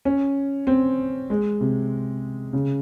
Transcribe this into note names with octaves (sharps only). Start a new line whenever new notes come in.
C#4
C4
G#3
C3
C#3